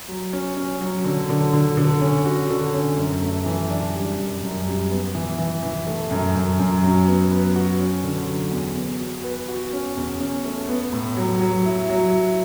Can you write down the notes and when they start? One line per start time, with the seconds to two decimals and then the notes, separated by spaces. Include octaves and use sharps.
0.08 F#3
0.33 C#4
0.57 C#4
0.81 F#3
1.05 D3
1.29 D3
1.53 D3
1.77 D3
2.01 C#4
2.25 F#4
2.50 D3
2.74 C#4
2.98 F#2
3.22 A3
3.46 E3
3.70 D4
3.94 G3
4.18 F#2
4.43 F#2
4.66 G3
4.91 B3
5.15 E3
5.38 E3
5.63 E3
5.87 A3
6.11 F#2
6.35 F#2
6.59 F#2
6.83 F#3
7.07 B3
7.31 B4
7.56 F#4
7.80 C#4
8.04 D3
8.28 F#3
8.52 E2
8.76 B3
9.00 F#4
9.24 B4
9.48 F#4
9.73 C#4
9.97 E2
10.20 C#4
10.45 A3
10.69 B3
10.93 A2
11.17 F#3
11.41 F#3
11.65 E4
11.89 F#3
12.13 E4